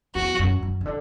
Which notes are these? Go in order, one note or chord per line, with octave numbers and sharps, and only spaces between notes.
E2 F#4
F#2
F#2
C#3
D3